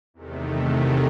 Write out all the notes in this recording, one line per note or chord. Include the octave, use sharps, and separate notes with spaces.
E2 C3 D#3 A3